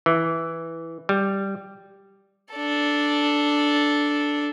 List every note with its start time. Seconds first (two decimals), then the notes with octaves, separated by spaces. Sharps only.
0.06 E3
1.09 G3
2.53 D4 A4